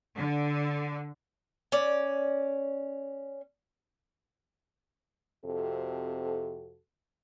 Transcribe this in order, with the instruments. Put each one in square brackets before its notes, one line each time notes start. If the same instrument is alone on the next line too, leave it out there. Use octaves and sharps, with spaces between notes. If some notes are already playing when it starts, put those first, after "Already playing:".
[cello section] D3
[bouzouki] C#4 D5
[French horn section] F2 C3 F#4 A4